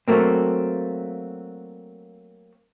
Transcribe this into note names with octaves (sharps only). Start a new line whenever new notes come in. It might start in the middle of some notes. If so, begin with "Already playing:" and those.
F#3 A3 A#3 C4